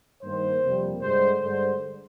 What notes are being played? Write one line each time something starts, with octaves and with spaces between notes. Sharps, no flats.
G2 D#3 A#3 C5
F2 C3 G3 A#3
G2 D3 G#3 C5
G2 D3 G#3 C5